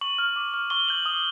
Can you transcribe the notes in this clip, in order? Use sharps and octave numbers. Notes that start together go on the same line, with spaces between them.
C#6 F#7
F6
D6
F6
C#6 G7
E6 G6 F#7
D#6